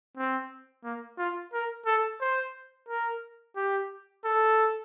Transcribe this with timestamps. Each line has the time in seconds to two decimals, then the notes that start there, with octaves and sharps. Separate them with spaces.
0.17 C4
0.84 A#3
1.18 F4
1.53 A#4
1.86 A4
2.21 C5
2.89 A#4
3.56 G4
4.25 A4